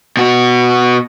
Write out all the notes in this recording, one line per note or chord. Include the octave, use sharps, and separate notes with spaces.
B2 F#4